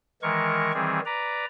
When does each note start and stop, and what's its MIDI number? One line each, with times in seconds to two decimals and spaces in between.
0.22 0.72 51
0.22 0.72 52
0.22 0.72 56
0.22 0.72 70
0.22 0.72 85
0.74 1.00 51
0.74 1.00 52
0.74 1.00 55
0.74 1.00 60
0.74 1.00 68
1.05 1.45 71
1.05 1.45 74
1.05 1.45 82